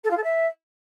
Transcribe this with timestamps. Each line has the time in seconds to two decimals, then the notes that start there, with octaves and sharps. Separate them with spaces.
0.04 A4
0.10 F4
0.17 A4
0.23 E5